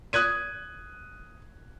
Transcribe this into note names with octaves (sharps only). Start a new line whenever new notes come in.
D#6 F#6 G#6 D#7